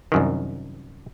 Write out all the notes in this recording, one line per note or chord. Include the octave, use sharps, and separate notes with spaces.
C2 F#2 D#3